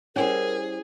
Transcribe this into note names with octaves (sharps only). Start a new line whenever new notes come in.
G3 C#4 E4 G#4 A#4 C5 C#5 G#5